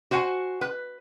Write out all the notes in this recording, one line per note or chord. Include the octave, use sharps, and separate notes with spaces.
F#4 C5 F#5 G#5
B4